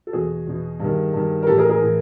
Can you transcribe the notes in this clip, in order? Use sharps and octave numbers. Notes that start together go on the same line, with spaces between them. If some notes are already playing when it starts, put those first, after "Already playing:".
A4
E2 B2 F#4 G#4
E2 B2
G2 D#3
G2 D#3
A#4
A2 E3 G4 A4
G#4 A#4
G#4 A#4
A2 E3